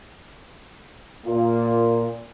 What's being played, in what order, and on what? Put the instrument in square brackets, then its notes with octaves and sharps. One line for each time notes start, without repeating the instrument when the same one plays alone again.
[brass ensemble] A#2